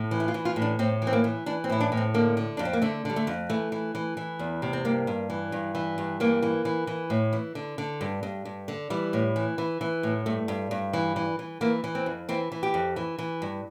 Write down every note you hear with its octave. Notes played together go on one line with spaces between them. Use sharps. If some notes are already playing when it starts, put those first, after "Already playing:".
Already playing: A2
E3
E4
F4
E3
F4
A2
D4
A2 C4
E3
C4
A#3
E3
E3 D4
C4
A2 E4
D4
A2
C4
D3 A#3
D3
F2 D4
C4
A#3
D3 A3
D3 G3
A3
F2
E3 A3
E3
E3
E3
E2
C3
C4
G2 A#3
G2
E3
G2
E3
G2
E3 A#3
E3
E3
E3
A2
E3
D3
D3
G2
G2
G2
D3
E3 G3
A2
E3
E3
E3
A2
G2 A3
G2
G2
E3
E3
E3
E3 A#3
E3
C4
F2
E3 C4
E3
G4
F2
E3
E3
G2